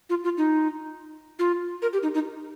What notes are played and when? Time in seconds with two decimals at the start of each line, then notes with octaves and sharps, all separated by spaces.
0.10 F4
0.24 F4
0.38 D#4
1.39 F4
1.82 A#4
1.93 G4
2.03 D#4
2.14 D#4